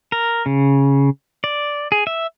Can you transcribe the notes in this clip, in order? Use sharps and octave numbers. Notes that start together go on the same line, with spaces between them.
A#4
C#3
D5
G#4
E5